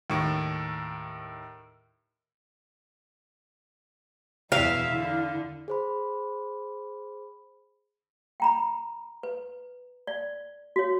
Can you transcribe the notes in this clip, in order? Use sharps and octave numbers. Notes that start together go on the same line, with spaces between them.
D#2 A2
E2 B2 E4 E5 F5
D3
G#4 C5 B5
G5 A#5 B5
B4
D5
F#4 C#5